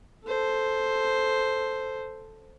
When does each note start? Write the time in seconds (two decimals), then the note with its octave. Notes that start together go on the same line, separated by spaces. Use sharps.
0.24 A4 C5